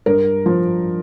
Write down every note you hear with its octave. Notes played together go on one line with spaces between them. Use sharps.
G2 A#4
F3